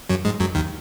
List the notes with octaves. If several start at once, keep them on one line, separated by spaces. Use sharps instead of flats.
F#2 F#3
G#2 G#3
F#2 F#3
D#2 D#3